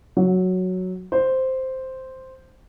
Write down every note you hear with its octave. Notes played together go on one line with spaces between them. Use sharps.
F#3
C5